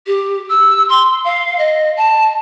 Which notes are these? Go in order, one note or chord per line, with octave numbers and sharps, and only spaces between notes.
G4
E6
C6
F5
D#5
A5